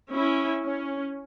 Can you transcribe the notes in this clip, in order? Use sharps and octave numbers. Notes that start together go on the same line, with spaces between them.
C#4 E4
C#4